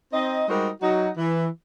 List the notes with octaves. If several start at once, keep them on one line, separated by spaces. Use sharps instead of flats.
C4 D#4 D#5
G3 G#3 D#4 F#4 A#4 C5
F#3 D#4 F#4
E3